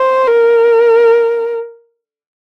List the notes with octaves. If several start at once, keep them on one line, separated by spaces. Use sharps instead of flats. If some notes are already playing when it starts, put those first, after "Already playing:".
Already playing: C5
A#4